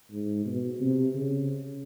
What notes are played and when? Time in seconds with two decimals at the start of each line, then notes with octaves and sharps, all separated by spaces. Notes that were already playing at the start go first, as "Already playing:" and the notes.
0.11 G#2
0.46 B2
0.80 C3
1.15 C#3